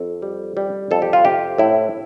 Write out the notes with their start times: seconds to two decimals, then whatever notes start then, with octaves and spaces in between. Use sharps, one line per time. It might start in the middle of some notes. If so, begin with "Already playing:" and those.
Already playing: F2 A4
0.22 G3
0.57 G3
0.91 F2 A4
1.02 G4
1.13 F4
1.24 C3 G4
1.58 A2 E4